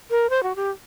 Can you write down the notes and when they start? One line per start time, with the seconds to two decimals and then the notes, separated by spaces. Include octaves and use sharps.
0.11 A#4
0.30 C5
0.43 F#4
0.56 G4